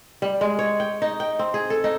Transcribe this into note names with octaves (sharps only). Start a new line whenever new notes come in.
G3
G#3
C#5
G5
D#4
G5
C4
G#4
A4
D#4